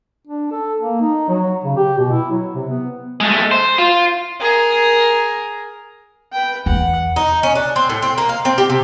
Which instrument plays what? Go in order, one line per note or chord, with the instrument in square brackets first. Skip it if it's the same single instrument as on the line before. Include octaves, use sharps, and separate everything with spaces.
[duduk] D4
A4
A#3
D#4
F#3
C#3
G4
B2
E4
F#3
C3
B3
[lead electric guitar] G#3 A3
C5
F4
[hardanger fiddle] G#4 A#4
[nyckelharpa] B4 G5
[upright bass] E2 [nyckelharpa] F#5
[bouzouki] D#4
C#4
D4
C4
A2
C4
A#3
F5
C4
G4
C3